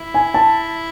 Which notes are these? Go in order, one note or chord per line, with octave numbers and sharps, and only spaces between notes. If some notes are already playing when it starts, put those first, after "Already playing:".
Already playing: E4
G#5
A5